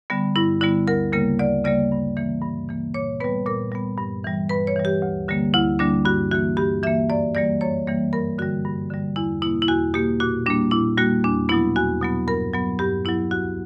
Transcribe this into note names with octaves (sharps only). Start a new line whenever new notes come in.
D3 G3 B3
G2 E4
D3 G3 B3 E4
D2 A#4
C#3 G3 A#3 A#4
D2 D5
C#3 G3 A#3 D5
G2
E3 A#3
G2
E3 A#3
A#2 C#5
G3 B3 B4
A#2 A#4
G3 B3
G2
E3 G3
G2 B4
C#5
E3 G3
G4
D2
D3 G3 A#3
D2 E4
D3 G3 A#3 D4
G2 F#4
E3 A#3 F#4
G2 G4
E3 A#3 E5
F#2 D5
E3 G3 A#3 D5
F#2 C#5
E3 G3 A#3
G2 A#4
D3 G3 F#4
G2
D3 G3
E2 E4
B2 A#3 E4
E4
E2 F#4
B2 A#3 G4
A#2 F#4
G3 A#3 D4
A#2 E4
G3 A#3 F#4
E2 D4
B2 F#3 B3 E4
E2 F#4
B2 F#3 B3
G2 A#4
F#3 B3
G2 G4
F#3 B3 E4
D2 F#4